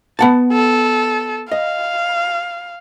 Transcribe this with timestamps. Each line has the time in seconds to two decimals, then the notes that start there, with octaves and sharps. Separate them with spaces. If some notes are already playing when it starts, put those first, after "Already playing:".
0.19 B3 F#5 A5
0.53 A4
1.51 D#5 F5